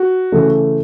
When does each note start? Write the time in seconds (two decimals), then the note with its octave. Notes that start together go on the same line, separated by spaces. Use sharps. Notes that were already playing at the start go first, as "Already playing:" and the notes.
Already playing: F#4
0.32 C#3 E3 A3